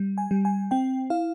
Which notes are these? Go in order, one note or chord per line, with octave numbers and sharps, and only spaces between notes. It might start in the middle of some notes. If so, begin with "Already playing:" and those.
Already playing: G3
G#5
G3
G#5
C4 G5
E4 F5